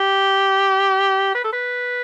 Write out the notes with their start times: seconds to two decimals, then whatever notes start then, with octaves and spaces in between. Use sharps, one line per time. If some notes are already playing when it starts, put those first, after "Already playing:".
Already playing: G4
1.35 B4
1.44 A4
1.53 B4